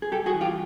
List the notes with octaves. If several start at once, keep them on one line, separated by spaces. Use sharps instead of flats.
G#4
C2 G4 A4
F#4 G#4
E3
F4 G4